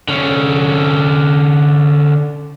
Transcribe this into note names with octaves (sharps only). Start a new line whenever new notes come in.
D3 C#4